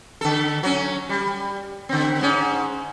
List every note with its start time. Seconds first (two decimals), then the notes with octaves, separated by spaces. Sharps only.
0.21 D3 A4
0.63 F#3 C#4
1.09 G3
1.89 D3 C4
2.21 G#2 C#4